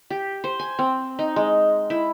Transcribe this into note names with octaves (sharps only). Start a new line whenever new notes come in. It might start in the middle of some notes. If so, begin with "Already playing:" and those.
G4
C5
G#5
C4
D#4
G#3
E4